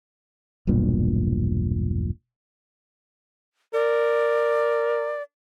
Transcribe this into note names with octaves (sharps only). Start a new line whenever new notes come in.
E1 B1 G2 A#2
A#4 D5